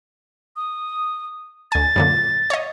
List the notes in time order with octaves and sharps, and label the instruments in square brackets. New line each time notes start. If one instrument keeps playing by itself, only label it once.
[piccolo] D#6
[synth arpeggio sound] D2 G#5 [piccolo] A6
[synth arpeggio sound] F#2 A#2 D3
C#5 D#5